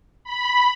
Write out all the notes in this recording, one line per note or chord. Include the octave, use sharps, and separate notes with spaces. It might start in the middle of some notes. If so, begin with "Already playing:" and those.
B5